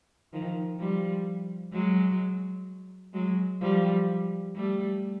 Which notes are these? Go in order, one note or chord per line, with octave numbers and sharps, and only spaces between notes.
D#3 F3
F3 G3
F#3 G#3
F#3 G#3
F3 G3
G3 A3